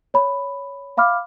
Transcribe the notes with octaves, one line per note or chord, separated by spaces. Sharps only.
C#5 B5
E5 F5 B5 D6 F6